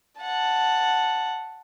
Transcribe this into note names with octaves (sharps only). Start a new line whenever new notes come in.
F#5 A5